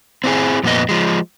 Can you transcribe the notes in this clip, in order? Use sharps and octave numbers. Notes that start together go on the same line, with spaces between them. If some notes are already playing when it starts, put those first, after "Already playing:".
C4 E4 G#4
F2 A#2 B3 F#4 D#5
F3 G#3